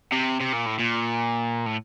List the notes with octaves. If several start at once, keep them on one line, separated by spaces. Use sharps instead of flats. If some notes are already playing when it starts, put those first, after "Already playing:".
C3
C3
A#2
A2
A#2
A2